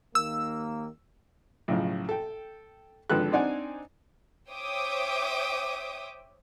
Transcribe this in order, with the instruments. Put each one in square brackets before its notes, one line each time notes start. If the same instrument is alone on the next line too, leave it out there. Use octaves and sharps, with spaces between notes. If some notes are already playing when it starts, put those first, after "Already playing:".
[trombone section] D#2 D#3 A#3 [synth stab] E6
[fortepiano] B1 A2 C#3 F3
A4 G5
G#1 D3 F3 A4 B4 F#6
C4 D4 D#4 D5 F#5 G#5
[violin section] C5 C#5 E5 G5 D6 D#6